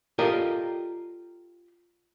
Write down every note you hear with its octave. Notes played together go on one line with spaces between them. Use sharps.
F4 G4 A4 A#4 D5 D#5